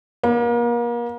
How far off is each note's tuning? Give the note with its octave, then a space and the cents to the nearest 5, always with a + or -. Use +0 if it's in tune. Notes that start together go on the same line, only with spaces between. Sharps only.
A#3 +35